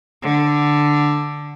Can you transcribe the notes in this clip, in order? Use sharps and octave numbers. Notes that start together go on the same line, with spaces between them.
D3